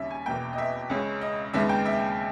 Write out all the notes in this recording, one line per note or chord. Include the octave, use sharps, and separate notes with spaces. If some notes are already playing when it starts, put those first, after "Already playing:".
Already playing: D#2 C#3 G3 C#4 E5
G#5
E2 B2 A#3 G5
D#5
E5
C#2 C#3 G#3 C#4
D#5
D#2 C#3 G#3 B3 E5
G5
E5